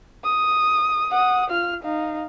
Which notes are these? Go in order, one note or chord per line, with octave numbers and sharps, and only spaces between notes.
D#6
F#5 D#6
F4 F6
D#4 F5